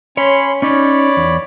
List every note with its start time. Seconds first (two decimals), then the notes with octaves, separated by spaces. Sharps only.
0.17 C#4 C#5 B5 C6
0.62 C#4 D#4 C#5 D5 B5
1.17 E2